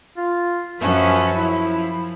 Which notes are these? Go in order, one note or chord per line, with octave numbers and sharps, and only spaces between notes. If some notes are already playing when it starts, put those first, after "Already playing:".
F4
F#2 F3 C#4 B4
F3 E4